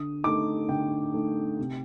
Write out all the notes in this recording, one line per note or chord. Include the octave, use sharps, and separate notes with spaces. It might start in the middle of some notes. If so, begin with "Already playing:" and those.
Already playing: D3 D#6
A3 D#4 D6
D3 G5
A3 D#4
C3